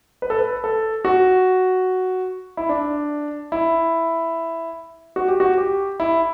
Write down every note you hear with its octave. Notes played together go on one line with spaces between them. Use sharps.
B4
A4
B4
A4
F#4
E4
D4
E4
F#4
G4
F#4
G4
E4